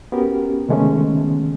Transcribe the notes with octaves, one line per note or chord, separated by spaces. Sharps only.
B3 C#4 F#4 G4 A#4
C3 D#3 G#3 A3 B3 C#4